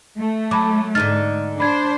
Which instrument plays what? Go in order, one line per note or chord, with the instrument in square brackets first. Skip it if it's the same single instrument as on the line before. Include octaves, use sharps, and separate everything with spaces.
[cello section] A3
[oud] F#3 [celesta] A5 B5 D6
[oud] G#2 D3 D#4 [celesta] F6 A6
[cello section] D4 C5 [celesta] B5 G#6